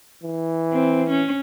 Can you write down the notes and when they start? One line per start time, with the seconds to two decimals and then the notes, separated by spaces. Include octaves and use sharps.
0.23 E3
0.73 C4
1.10 C#4